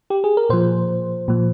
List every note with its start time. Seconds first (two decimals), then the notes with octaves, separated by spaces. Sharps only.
0.10 G4
0.24 G#4
0.37 A#4
0.50 A#2 F3 C5
1.28 A#2 F3